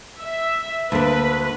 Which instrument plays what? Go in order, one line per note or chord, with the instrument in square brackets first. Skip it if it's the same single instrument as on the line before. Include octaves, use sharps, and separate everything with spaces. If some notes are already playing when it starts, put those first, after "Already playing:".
[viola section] E5
[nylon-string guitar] D2 A#3 [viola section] B4